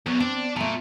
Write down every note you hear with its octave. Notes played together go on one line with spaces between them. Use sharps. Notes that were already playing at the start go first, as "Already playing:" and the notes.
E2 F#3 B3
C4 D4
A#2 A3 A5